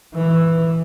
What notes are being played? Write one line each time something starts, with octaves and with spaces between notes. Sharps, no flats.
E3